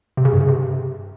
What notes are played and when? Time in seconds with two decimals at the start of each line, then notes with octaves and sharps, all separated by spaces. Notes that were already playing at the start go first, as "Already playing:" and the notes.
0.17 C3
0.25 C#3
0.33 G2
0.41 C#3
0.48 C3